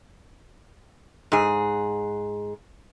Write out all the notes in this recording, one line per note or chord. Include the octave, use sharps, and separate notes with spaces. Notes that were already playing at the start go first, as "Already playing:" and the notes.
G#2 G#4